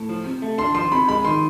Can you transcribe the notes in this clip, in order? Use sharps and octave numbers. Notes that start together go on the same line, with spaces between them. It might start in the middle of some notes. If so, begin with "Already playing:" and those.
Already playing: A2
F3
C3
A3
D4 C6
F3 C6
C3 B5
G#3 B5
D#3 C6